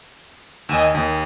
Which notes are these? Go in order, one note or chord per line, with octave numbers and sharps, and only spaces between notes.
D#2 D#5 G#5 E6
D#2